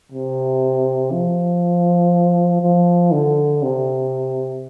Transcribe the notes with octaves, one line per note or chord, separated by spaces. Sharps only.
C3
F3
F3
D3
C3